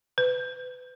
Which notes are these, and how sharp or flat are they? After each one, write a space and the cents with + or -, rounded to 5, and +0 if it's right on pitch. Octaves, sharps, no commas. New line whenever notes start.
B4 +30